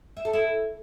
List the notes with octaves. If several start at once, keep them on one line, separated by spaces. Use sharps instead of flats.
E5
A4
E4